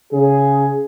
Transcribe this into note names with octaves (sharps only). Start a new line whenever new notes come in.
C#3 G#4